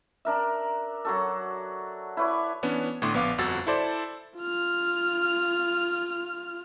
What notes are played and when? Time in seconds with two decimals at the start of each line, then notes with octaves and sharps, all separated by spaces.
0.25 D4 A#4 E5
1.05 F#3 F#4 A4
2.17 E4 B4 C#5 D5
2.63 E3 B3 C#4 D4
3.02 A2 D3 A3 C6 D6
3.14 A#1 B3 F5 D6
3.38 G1 F2 F#4 E6 A6
3.67 E4 A4 C5 D5
4.38 F4 F6